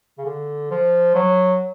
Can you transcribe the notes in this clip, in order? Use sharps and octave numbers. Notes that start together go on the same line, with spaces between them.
C#3
D3
F3
F#3